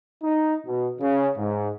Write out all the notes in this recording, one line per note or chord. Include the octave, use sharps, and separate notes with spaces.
D#4
B2
C#3
G#2